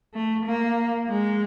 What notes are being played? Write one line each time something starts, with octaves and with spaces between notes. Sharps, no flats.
A3
A#3
G#3